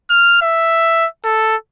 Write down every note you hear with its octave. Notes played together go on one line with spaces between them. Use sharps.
F6
E5
A4